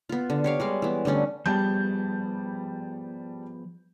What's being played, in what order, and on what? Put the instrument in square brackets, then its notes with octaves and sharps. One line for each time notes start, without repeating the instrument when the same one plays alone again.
[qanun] B3 F4
D3
G4 C#5 F5
G3 G#3 F5
E3 B3
D3 G3 A3 C#4
[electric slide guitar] F3 B3 G#4 [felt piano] G3 A5 G6